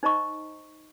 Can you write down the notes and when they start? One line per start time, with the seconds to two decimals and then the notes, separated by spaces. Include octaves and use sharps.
0.03 D#4 C5 D#5 A#5 C#6